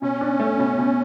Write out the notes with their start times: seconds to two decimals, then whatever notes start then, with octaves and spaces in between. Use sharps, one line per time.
0.02 B2 C#4
0.21 D4
0.40 A3
0.59 B2
0.78 B2